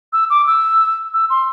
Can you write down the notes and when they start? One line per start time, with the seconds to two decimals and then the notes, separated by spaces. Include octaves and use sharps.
0.13 E6
0.30 D6
0.47 E6
1.14 E6
1.30 C6